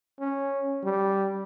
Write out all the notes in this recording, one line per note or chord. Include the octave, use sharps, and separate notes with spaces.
C#4
G3